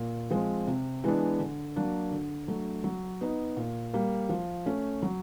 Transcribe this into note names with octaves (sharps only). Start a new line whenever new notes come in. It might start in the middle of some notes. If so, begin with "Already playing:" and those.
Already playing: A#2
F3 G#3 C4
C3
E3 G#3 B3 D4
D3
F#3 A#3 D4
D3
F#3 A3 D4
F#3
B3 D#4
A#2
G3 A#3
F3
A3 C#4
F#3